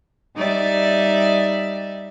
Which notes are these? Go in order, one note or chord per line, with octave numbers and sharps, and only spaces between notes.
G3 D#4 D5 E5